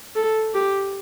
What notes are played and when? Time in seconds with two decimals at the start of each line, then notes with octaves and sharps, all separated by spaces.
0.16 A4
0.55 G4